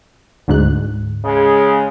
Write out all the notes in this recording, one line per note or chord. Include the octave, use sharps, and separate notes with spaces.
D2 G#2 F#6
C#3 G#3